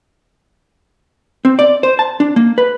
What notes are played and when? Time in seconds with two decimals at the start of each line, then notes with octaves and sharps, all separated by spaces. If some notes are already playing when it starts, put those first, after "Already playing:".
1.45 C4
1.59 D5
1.83 C5
1.99 A5
2.20 D4
2.36 A#3
2.58 B4